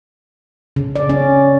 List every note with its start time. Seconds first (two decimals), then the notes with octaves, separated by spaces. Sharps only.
0.76 C#3
0.96 D5
1.09 C#4